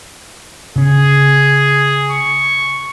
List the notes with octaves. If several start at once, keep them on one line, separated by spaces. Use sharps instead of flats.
C#3 C#4 G#4
C#6